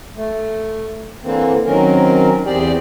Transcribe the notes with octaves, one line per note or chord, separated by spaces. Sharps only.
A3
D3 E3 A#3 C4
D#3 F#3 C4 C#4 A#4
E2 C4 G4 G#4 D5 G5